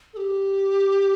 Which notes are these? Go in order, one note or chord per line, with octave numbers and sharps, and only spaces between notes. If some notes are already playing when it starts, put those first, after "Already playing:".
A4
G4